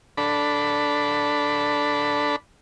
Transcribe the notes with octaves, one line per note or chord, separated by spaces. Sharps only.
D4 A4 B5